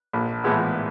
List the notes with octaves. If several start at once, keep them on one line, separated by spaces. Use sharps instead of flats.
A#1
A2 E3 G#3 B3